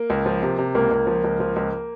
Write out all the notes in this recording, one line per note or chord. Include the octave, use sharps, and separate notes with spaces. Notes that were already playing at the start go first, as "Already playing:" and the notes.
Already playing: A#3
C#2
F3
C3
C3
C#2 A#3
C#2
F3
C#2
F3
C#2